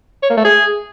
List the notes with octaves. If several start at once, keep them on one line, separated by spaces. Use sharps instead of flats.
C#5
A#3
A3
G#4